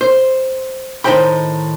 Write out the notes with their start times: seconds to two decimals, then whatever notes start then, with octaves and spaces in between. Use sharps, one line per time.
0.01 C5
1.04 A2 D#3 D#4 C5 G5 B5